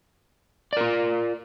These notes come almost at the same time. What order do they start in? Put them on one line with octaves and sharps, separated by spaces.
D5 A#4 F4